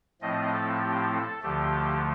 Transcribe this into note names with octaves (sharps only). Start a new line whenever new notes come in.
A2 F3 A3 C4 D#5
A4
G4
A4
D2 D3 F3 A3 G4